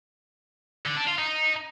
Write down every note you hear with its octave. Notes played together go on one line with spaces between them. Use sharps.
D3
D4
F4
D#4